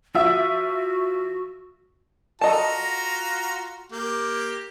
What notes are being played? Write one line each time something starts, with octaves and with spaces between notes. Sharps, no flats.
F3 F#4 E5
F4 F#4 A4 D#5 A5 A#5
A#3 G4